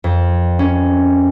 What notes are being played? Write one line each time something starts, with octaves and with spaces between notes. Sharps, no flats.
F2
C#4